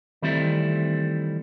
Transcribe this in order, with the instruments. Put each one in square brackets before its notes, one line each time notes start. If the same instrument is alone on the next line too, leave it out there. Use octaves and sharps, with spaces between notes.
[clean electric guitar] D#3 E3 G3 A3 C4 E4